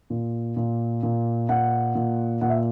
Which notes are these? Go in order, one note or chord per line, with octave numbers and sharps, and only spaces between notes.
A#2
A#2
A#2
A#2 F#5
A#2
A#2 F#5
E5